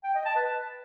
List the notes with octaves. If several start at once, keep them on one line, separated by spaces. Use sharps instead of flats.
G5
D#5
A5
B4